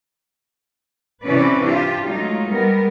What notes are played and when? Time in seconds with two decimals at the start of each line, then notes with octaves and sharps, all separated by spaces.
1.25 C3 E3 C#4 B4 D5
1.63 D4 F4 G4
2.07 F#3 G#3 A3 D#4 F4
2.50 G3 G#3 B3 A#4